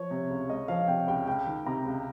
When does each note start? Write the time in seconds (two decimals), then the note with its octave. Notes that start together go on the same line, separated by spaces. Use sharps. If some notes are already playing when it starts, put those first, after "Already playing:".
Already playing: F3 C#5
0.11 C3
0.30 C#2
0.49 G#3 D#5
0.68 F3 F5
0.88 C3 G5
1.07 C#2 G5
1.27 C#2 G5
1.47 D#3
1.66 C3 A#5
1.85 C#2